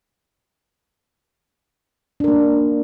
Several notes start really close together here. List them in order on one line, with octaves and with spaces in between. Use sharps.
D4 A#4 A#3